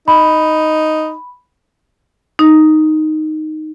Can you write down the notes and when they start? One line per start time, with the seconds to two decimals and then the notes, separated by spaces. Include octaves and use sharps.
0.08 D#4 B5
2.39 D#4